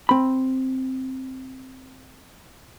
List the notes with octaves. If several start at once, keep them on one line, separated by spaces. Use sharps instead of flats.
C4 B5